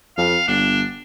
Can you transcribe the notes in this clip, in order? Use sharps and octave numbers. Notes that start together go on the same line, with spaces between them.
F2 F5
G1 D4